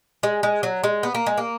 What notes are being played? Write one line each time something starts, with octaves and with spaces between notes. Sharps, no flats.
G#3
G#3
F#3
G#3
B3
A#3
G#3
A#3